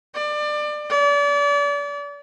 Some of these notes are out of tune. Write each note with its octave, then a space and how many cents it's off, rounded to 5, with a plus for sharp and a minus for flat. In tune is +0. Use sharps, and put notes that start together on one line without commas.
D5 +25
D5 -35